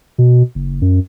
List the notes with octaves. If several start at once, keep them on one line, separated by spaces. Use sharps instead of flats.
B2
F#1
F#2